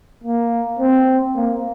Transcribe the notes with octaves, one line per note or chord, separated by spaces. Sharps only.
A#3
C4
A#3